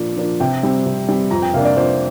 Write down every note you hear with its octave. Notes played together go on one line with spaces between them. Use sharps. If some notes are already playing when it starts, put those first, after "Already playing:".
Already playing: A#2 F3 A#3 D4
F3 A#3 D4
C3 G5
G3 C4
C3
G3 C4
F2 A#5
G5
C3 A#3 D4 F5
D5
F2 C5